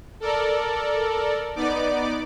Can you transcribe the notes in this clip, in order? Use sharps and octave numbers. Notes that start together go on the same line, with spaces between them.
A4 A#4 D5
B3 D#4 D5 D6